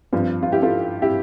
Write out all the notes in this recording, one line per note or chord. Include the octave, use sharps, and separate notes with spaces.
G2 F3 C4
F4
E4 G4
F4 A4
E4 G4